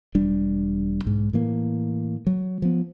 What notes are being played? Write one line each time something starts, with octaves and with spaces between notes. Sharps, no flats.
E1 G3 D4
B1 G#2
A2 E3 A#3
F#3
F3 B3